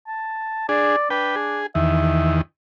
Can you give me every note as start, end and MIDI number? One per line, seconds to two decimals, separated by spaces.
0.07 0.64 81
0.69 0.96 62
0.69 0.96 68
0.69 1.10 74
1.10 1.61 62
1.10 1.35 71
1.10 1.35 79
1.36 1.66 68
1.75 2.41 40
1.75 2.41 51
1.75 2.35 76